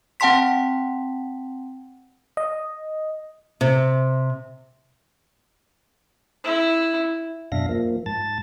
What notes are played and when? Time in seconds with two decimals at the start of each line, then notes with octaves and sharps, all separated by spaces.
0.20 C4 F#5 G5 A5 C6 B6
2.37 D#5
3.61 C3
6.44 E4
7.52 F#2 B2 D4 E5 F5 A#6
7.69 F3 A#3
8.06 G#2 A5 A6